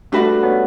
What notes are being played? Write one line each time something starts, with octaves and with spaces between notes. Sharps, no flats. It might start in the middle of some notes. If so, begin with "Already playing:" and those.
G3 A3 D4 F#4 B4 E5
B3 C#4